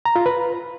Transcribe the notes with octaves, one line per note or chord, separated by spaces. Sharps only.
A#5
F4
B4